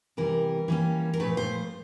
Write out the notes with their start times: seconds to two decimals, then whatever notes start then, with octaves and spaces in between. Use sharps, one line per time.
0.17 C3 E3 G3 A#4
0.68 E3 G3 A#3 C#4
1.13 A#4
1.20 A#2 F3 A3 B4
1.37 C5